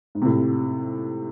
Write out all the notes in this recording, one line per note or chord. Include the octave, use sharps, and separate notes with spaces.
G#2
C3
A2